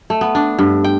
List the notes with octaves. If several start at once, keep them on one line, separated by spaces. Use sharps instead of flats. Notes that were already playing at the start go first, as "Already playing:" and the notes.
A3
B3
D4
G2
G5